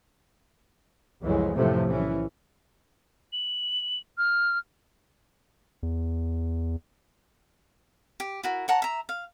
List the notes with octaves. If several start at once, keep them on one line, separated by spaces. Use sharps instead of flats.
C2 F2 E3 F#3 G#3
F#2 A2 C3 E3 F3 A3
B1 E3 C#4
F#7
F6
E2
G4
E4 F#4 A#4
C#5 F#5 A5 A#5
E5 A#5
F5